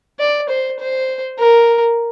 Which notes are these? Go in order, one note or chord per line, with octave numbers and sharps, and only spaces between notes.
D5
C5
C5
A#4